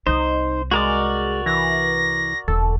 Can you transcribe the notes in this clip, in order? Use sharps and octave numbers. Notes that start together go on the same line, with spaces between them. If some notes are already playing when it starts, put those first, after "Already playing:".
C2 C3 D#4 C5
G#3 F#4 A#4 D5
E3 A#6
E1 D3 A4